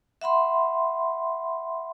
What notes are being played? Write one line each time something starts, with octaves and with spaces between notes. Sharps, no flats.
E5 F#5 B5 C6